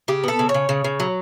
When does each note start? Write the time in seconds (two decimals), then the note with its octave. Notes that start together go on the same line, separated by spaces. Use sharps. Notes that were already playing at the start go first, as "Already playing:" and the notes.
0.08 C#3 G4
0.24 B3 A4
0.39 C#3
0.49 C#5
0.54 C#3
0.69 C#3
0.84 C#3
1.00 F#3